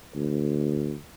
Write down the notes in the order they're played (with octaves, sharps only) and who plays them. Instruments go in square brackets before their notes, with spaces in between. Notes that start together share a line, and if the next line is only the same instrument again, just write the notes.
[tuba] D2